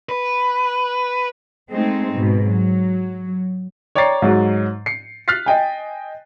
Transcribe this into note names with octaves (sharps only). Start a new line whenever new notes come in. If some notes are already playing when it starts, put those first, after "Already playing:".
B4
G#3 A3 C4 D#4
G#2 B2
F#3
C#5 D5 G5 A#5 A6 C7
G#2 F#3 G#3
C7 C#7
F6 F#6 A6 B6 C7
D#5 G5 G#5